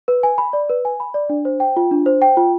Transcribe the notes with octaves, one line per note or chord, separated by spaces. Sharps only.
B4
G#5
B5
D5
B4
G#5
B5
D5
D4
C5
G5
F4
D4
C5
G5
F4